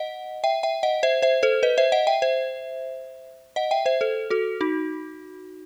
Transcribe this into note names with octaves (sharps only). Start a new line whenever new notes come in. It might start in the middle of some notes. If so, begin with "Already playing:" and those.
Already playing: D#5 F#5
E5 G5
E5 G5
D#5 F#5
C5 E5
C5 E5
A4 C5
B4 D#5
C5 E5
D#5 F#5
E5 G5
C5 E5
D#5 F#5
E5 G5
C5 E5
A4 C5
F#4 A4
D#4 F#4